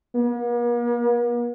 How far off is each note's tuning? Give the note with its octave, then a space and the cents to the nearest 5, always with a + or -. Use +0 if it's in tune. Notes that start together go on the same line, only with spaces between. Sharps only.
A#3 +45